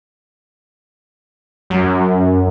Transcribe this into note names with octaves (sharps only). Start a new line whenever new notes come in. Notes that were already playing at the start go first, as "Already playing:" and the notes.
F#2